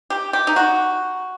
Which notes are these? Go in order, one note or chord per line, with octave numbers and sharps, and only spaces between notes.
G4
G4
D#4
F#4